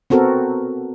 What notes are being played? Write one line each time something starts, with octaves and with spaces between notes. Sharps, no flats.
B3 C4 F#4 A4 A#4